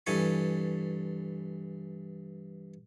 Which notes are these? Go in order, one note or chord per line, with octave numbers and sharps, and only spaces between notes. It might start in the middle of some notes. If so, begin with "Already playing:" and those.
G2 E3 A4 G#5 C#6